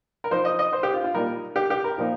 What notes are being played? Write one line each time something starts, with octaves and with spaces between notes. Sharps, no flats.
A#4
F3 D#4 C5
D#5
D#5
C5
G4
F4
F4
A#2 G3 D#4 A#4
G4
G4
A#4
A#2 F3 A#3 D#4